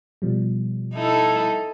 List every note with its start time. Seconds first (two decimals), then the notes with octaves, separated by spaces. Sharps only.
0.22 B2 F3 G3
0.94 D#4 E4 A4